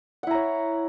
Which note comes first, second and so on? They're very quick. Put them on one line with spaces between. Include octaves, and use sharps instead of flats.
F#5 E4 A#5 C#5